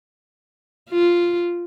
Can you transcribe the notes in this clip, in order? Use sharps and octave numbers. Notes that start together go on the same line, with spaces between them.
F4